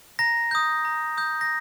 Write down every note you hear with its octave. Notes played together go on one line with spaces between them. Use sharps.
A#5 A#6
D#6 G6
A#5
D#6 G6
A#6